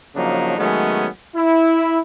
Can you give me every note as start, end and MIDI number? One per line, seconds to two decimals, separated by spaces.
0.15 0.54 49
0.15 0.54 53
0.15 0.54 54
0.15 0.54 58
0.15 0.54 62
0.15 0.54 63
0.58 1.07 51
0.58 1.07 54
0.58 1.07 56
0.58 1.07 57
0.58 1.07 59
0.58 1.07 61
1.35 1.99 64